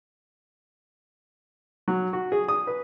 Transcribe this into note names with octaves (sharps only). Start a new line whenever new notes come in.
F#3
F#4
G#4
D#6
B4